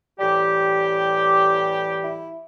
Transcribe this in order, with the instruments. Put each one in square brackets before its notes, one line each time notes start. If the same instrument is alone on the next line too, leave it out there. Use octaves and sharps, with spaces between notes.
[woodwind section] A2 E3 G3 G4
E4